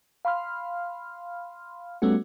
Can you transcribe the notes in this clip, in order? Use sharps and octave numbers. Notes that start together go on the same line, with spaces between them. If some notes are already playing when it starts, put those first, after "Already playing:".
F5 B5 C6 F6
G3 A3 B3 C#4 F#4